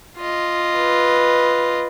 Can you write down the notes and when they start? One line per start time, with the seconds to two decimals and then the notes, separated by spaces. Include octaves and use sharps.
0.18 F4 D#5
0.77 B4